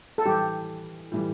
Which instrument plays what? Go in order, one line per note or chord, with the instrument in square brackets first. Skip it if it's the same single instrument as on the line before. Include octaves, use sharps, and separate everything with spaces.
[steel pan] A4
[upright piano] A2 E3 G3 [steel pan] G4
[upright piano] A2 E3 G3